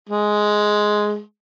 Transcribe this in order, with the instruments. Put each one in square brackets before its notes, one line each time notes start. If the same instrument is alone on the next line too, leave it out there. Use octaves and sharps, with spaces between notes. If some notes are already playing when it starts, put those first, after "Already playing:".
[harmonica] G#3